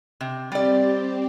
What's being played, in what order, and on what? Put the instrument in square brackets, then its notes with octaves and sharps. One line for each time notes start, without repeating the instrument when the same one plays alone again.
[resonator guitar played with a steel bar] C3
[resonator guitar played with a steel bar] G3 D5 [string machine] C4 G4